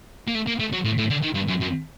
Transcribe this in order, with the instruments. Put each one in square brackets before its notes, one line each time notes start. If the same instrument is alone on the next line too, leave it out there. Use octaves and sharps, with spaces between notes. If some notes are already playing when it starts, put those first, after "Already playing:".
[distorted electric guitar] A#3
A3
A#3
A3
F#3
A2
A2
D3
D#3
G2
F#2
F#2